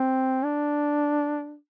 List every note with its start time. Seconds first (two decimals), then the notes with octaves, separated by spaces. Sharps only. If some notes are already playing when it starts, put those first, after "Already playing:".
Already playing: C4
0.44 D4